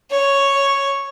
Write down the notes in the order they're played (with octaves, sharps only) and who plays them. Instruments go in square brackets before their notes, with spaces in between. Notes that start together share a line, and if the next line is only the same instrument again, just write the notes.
[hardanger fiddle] C#5